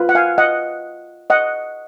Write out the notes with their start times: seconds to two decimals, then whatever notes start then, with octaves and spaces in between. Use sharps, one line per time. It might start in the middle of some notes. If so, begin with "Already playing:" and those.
Already playing: F4 B4
0.09 F#5
0.15 F5 G#5
0.38 D#5 F#5
1.30 D#5 F#5